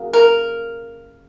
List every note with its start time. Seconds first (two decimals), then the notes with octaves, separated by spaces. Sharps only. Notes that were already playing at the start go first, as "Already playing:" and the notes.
Already playing: C#3 F#3 A#3
0.13 A#4